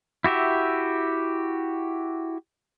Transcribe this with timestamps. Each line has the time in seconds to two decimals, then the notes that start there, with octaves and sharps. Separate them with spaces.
0.24 E4 F#4 G4 E5